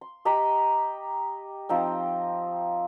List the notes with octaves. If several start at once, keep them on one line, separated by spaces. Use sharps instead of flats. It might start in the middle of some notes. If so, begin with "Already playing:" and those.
C6
G4 D#5 A#5 B5
F3 C4 D#4 G5